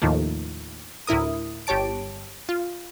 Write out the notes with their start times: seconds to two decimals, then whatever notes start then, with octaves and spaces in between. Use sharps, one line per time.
0.02 D#2 A2 D#3 F3 A3 A#3
1.07 D2 A2 E4 A#4 D#6
1.67 G1 G4 C#5 A5 D7
2.49 F4